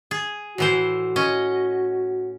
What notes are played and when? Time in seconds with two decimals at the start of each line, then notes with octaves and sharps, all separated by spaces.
0.11 G#4
0.58 A2 E3 F#4 C5
1.16 C#4 D#5